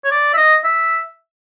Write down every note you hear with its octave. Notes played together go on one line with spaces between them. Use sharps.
C#5
D5
E5
D#5
E5